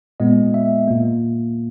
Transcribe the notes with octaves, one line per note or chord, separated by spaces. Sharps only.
A#2 G#3 B3 D#5
E5
A#2 A#3